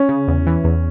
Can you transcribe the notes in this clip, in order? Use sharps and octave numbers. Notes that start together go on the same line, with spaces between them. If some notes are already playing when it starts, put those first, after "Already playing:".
Already playing: C#4
C#3
E2
E3
E2